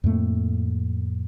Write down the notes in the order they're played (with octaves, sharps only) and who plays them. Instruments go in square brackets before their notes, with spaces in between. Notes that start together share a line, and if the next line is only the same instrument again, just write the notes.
[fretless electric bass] F2 A2 A3 A#3